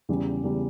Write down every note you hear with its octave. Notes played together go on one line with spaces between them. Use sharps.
E2 C#3 G3
E2 C#3 G3